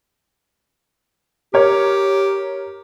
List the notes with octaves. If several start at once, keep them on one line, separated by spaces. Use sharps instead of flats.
G4 A#4 C#5